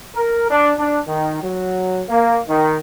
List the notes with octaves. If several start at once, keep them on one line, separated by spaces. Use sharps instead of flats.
A#4
D4
D4
D#3
F#3
A#3
D#3